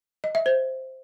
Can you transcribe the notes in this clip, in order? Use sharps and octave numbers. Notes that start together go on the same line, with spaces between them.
D#5
E5
C5